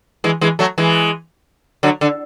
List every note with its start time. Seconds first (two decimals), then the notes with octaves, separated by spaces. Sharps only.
0.24 E3 G#3
0.41 E3 G#3
0.59 F#3 A3
0.78 E3 G#3
1.83 D3 F#3
2.01 D3